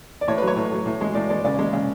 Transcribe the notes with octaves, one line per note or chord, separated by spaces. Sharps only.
D5
A2 C#5
F#3 B4
C#5
A2
F#3
A2
G#3
A2 D5
G#3 D5
C#3 D5
G#3
C#3